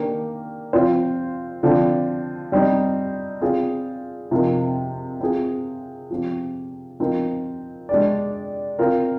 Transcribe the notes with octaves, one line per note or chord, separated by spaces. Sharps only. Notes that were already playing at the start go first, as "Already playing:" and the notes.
Already playing: D#3 A#3 D4 G4
F3 C4 F4 C5
D3 F3 C4
G3 C4 D#4
C4 F4 G#4
C3 F3 C4 D#4 A#4
C4 F4 G#4
F3 C4 G4
F3 C4 D#4 A#4
G#3 D4 G4 D5
C4 F4 A#4